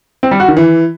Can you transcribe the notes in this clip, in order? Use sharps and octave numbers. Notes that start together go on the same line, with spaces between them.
C4
G3
F#4
D#3
E3